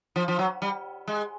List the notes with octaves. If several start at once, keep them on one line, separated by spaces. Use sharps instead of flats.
F3
F3
F#3
G3
G#3